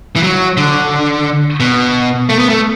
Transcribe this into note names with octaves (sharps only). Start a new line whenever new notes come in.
E3
F#3
D3
B2
A3
B3
A3